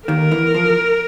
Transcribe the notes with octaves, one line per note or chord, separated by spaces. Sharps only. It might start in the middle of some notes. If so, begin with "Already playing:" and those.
D#2 D#3 A#4
E2 E3
F3